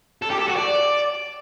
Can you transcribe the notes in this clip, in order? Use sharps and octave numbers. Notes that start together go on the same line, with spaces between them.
A4
G4
A4
F#4
D5